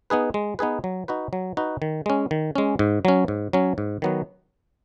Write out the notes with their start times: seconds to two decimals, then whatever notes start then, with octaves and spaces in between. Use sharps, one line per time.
0.10 B3 D#4 G#4 B4
0.34 G#3
0.59 B3 D#4 G#4 B4
0.84 F#3
1.08 D#4 F#4 B4
1.33 F#3
1.57 D#4 F#4 B4
1.82 D#3
2.06 G#3 C#4
2.31 D#3
2.55 G#3 C#4
2.79 G#2
3.05 F#3 C#4
3.28 G#2
3.53 F#3 C#4
3.78 G#2
4.02 D#3 F#3 B3 F#4